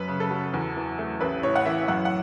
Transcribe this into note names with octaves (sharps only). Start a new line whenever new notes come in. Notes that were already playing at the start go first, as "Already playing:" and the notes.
Already playing: F#2 B4
C#3
A4
F#3
E2
E3
A3
A1 B4
A2 C#5
F#5
E3 E5
F#2 F#5
F#5